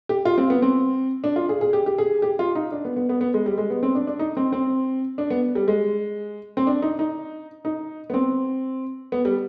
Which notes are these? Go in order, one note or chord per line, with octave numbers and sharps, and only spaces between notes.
G4
F4
C4
B3
C4
D4
F4
G#4
G#4
G4
G4
G#4
G4
F4
D#4
D4
B3
B3
B3
B3
G#3
G3
G#3
B3
C4
D4
D4
D#4
C4
C4
D4
B3
G3
G#3
C4
D4
D#4
D#4
D#4
B3
C4
B3
G3